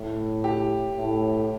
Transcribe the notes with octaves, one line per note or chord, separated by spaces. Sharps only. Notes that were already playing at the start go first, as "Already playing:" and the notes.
Already playing: A2
G4
A2